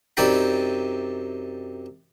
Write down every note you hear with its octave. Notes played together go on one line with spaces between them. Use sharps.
F#2 C3 D#4 D5 G5 B5